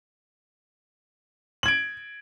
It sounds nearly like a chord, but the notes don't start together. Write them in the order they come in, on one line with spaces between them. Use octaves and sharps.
F#7 G#6 D7